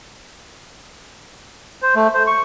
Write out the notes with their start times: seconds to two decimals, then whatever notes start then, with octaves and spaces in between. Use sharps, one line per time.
1.82 C5
1.95 A3
2.14 C5
2.27 C#6